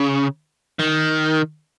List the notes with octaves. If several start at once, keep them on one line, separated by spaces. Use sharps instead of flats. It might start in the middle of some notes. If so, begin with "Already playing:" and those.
Already playing: C#3
D#3